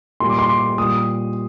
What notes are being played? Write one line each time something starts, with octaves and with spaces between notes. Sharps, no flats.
A#2 G3 C6
D6
C6
D6
A#2 G3 D#6